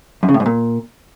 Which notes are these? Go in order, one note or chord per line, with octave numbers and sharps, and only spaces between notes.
F#2
C#3
A2
G#2
A#2